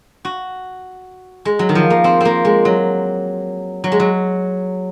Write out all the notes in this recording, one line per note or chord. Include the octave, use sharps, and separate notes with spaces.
F#4
G#3
F#3
D#3
F3
A#3
C4
A#3 C4
G#3
F#3
F#3
G#3
F#3